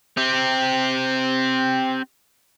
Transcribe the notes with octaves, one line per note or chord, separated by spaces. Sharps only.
C4 G4